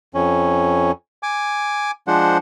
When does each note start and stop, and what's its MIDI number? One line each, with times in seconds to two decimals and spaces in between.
0.15 0.91 41
0.15 0.91 61
1.23 1.91 80
1.23 1.91 86
2.08 2.38 53
2.08 2.38 56
2.08 2.38 62
2.08 2.38 72
2.08 2.38 78